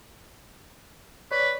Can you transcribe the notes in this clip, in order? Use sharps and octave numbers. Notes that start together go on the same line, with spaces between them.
B4 C#5 D5